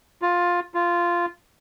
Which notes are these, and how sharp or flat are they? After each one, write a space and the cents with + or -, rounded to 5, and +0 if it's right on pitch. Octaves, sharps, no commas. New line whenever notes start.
F4 +10
F4 -10